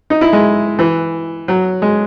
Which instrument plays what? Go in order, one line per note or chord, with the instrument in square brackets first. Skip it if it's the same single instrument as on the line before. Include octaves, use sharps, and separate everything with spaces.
[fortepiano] D#4
E4
G#3
E3
F#3
G#3